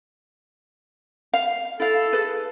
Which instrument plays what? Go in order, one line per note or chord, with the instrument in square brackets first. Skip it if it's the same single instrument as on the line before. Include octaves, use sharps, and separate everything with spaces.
[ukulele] F5
[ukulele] E4 F5 [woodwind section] A4
[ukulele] G#4 B4